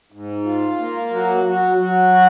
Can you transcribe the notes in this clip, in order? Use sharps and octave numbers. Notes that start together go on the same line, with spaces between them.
G#2
F4
A#3
F#3
F#3
F#3
F#4